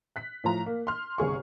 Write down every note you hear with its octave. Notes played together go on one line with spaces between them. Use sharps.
F#6 B6
A2 F3 A#5
A#3
C6 F6
G1 C2 G#4 C#6